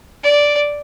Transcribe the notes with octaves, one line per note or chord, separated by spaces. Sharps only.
D5